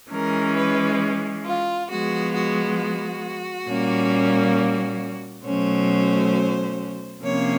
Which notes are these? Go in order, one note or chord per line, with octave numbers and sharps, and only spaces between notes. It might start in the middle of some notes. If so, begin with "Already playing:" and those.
E3 G#3 C#4 A#4
B4
F4
F3 G#3 B3 F#4
F#4
F#4
A#2 G3 A#3 C#4
B2 F#3 A3 C#4 C5
C3 F3 A#3 C#4 C#5